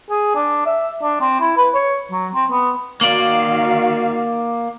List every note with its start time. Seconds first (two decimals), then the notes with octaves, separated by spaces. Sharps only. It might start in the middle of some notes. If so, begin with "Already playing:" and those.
0.10 G#4
0.35 D4
0.66 E5
1.03 D4
1.21 C4
1.40 E4
1.57 B4
1.74 C#5
2.12 F#3
2.35 C4
2.51 B3
3.01 D#3 A#3 F#4 D5 F5